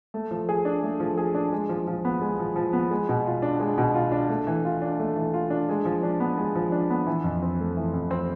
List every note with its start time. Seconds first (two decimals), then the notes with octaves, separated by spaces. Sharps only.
0.14 A3
0.31 F3
0.49 G#4
0.65 D4
0.83 A3
1.00 F3
1.18 G#4
1.35 D4
1.53 G#3
1.69 F3
1.87 F3
2.05 B3
2.22 G#3
2.39 F3
2.56 F3
2.73 B3
2.91 G#3
3.09 B2
3.26 F4
3.42 D4
3.60 G#3
3.78 B2
3.95 F4
4.12 D4
4.29 A3
4.47 E3
4.65 F4
4.82 D4
4.99 A3
5.16 E3
5.34 F4
5.50 D4
5.69 G#3
5.85 F3
6.03 D4
6.20 B3
6.38 G#3
6.55 F3
6.72 D4
6.90 B3
7.07 E3
7.24 F2
7.42 C4
7.60 A3
7.77 E3
7.94 F2
8.11 C4